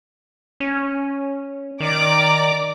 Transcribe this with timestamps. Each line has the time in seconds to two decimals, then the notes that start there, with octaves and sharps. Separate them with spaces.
0.60 C#4
1.80 D#3 D5 A#5 D6